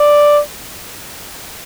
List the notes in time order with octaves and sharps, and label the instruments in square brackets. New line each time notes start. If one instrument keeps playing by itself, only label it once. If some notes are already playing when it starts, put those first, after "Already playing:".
Already playing: [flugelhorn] D5